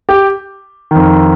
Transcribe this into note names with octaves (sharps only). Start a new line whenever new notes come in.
G4
F2 D#3